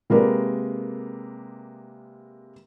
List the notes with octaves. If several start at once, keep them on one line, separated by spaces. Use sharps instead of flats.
C3 G#3 A#3 A#4 B4 D5